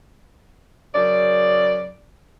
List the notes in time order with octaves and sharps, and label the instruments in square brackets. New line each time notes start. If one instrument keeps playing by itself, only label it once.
[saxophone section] F#2 C#3 D5